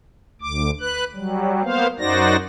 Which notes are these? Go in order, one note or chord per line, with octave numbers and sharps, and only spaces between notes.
D2 D6
B4 F#6
F#3 G3
A#3 B3 C5 F5
F#2 D#4 F#4 C5 D5 A#6